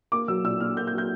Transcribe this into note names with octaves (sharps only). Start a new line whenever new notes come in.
A#3 D6
F#3 E6
A#2 E6
A#2 F6
A#3 G6
G6
F#3
G6